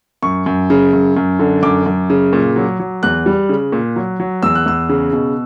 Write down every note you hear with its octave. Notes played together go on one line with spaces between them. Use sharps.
F#2 C#6
F#2
C#3
F#2
F#2
D3
F#2 D6
F#2
C#3
A#2
F#3
F#3
E2 F#6
G3
C#3
A#2
F#3
F#3
E2 E6
F#6
E2 E6
C#3
B2